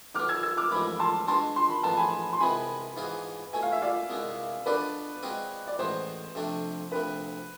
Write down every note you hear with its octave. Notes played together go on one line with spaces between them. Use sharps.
B1 B2 B3 D6 F6
E6 G#6
E6 G#6
D6 F6
A1 G#2 F3 G#3 B5 D6
A5 C6
B2 G#3 D4 A5 C6
C6
B5
A1 G#2 F3 B3 A5
G#5 B5
C6
C2 C3 G#3 B3 G#5 B5
G#2 E3 B3 F4 G#4
B2 A3 E4 G#5
F5
E5
D5 F5
C2 B2 G#3 B3
B2 B3 D4 F4 A4 B4 D5
B2 G#3 C4 F4 B4
D5
A1 A2 G#3 B3 C5
F2 C3 F3 A3 D4
D2 C3 F3 B4